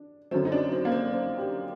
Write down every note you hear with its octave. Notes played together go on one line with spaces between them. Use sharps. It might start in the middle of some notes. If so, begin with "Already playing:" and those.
Already playing: D4
F#2 D3 F#3 A3 C4
D#4
D4
C4
A#3
C4
C4
G4